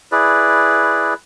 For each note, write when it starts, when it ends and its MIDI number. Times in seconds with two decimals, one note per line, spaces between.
0.12 1.14 64
0.12 1.14 68
0.12 1.14 71
0.12 1.14 74